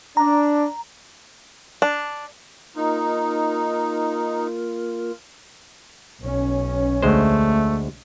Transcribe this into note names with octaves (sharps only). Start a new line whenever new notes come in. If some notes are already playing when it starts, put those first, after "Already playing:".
D4 A#5
D4
A#3 D#4 F4 A#4
B1 C#4
D2 G#3 A3 C5